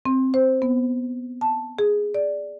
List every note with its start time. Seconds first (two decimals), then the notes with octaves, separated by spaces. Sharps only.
0.05 C4
0.34 C5
0.62 B3
1.41 A5
1.79 G#4
2.14 D5